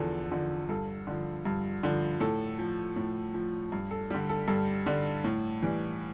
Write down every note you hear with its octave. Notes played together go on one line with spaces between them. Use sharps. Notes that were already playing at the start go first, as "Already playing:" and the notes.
Already playing: E2 D3 F3 A4
D3 F3
G2 A4
D3 F3
G2
D3 F3
A2 A4
F3
A2
F3
G2
A4
D3 G3 G4
A4
G2 A4
D3 G3
A2
E3 G3